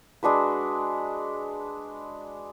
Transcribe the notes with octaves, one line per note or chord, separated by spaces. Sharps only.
G#3 D4 F#4 B4